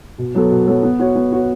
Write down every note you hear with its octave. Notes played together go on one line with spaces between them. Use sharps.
B2
F#3 B3 A4 C#5
B2
F#3 B3 A4 C#5
B3
F#4 C#5
B3
F#4 C#5